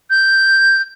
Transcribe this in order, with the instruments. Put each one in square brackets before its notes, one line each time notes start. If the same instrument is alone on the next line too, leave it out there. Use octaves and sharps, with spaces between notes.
[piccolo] G6